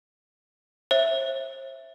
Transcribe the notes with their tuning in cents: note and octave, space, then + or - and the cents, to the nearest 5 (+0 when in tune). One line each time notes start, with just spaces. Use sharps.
C5 +40 E5 +0